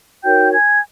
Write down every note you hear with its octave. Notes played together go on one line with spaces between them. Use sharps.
D#4 F#4 A#4 C#5 G5 G6
G#5 G#6